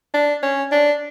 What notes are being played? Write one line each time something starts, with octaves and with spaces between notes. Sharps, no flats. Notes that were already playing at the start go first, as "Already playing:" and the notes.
D4
C#4
D4